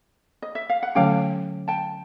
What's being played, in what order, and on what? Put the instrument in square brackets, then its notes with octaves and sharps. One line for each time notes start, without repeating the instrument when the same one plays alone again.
[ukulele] D#5
E5
F5
F#5
[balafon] D3 F#3 A3 C#4 [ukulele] F5 G5
[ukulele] G5 A5